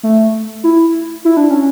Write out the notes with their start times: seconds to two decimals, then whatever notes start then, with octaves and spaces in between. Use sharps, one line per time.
0.03 A3
0.64 E4
1.25 E4
1.37 D4
1.50 C#4